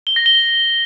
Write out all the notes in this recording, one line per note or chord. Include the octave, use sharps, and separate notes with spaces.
G7
A#6
G7